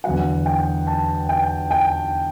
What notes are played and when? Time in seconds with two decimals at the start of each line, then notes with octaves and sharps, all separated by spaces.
0.04 E2 D3 F#3 F#5
0.46 G5
0.87 A5
1.29 G5
1.71 G5